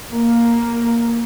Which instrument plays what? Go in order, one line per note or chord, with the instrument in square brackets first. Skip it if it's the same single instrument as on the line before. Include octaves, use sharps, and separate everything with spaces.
[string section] A#3